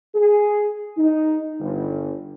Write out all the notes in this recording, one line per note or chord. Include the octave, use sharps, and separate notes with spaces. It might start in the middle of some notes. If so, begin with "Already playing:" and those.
G#4
D#4
G1